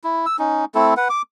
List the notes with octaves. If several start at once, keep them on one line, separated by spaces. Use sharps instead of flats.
E4
E6
C#4 D#4
A3 C4 E4 A4
B4 F#5
D6